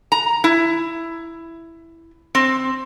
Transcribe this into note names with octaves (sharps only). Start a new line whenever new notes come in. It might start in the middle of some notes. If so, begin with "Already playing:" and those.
A#5
E4
C4